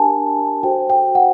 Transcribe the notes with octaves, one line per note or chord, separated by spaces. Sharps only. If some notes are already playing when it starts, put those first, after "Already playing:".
Already playing: D4 G4 A#4 G#5 A5
F#4 A4 C5 G5
G5
F#5